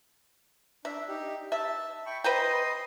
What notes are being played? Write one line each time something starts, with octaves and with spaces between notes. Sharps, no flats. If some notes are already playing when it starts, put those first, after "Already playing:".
D4 E5
D#4 G4
E5 A5
G5 B5 C#6
B4 C5 D#5 G5 C6 D#6